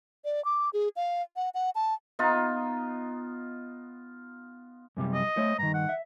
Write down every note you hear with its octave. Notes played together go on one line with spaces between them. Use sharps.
D5
D6
G#4
F5
F#5
F#5
A5
B3 D#4 F4
F#2 C3 G3
D#5
A3 C5 C#5
G2 D#3 A#5
F#5
E5